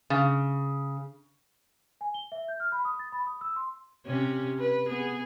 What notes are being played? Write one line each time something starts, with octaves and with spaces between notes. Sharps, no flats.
C#3
G#5
G7
E5
G6
F6
B5
D#6
A6
B5
D#6
E6
C6
C3 C#4 G4
B4
B3 G#4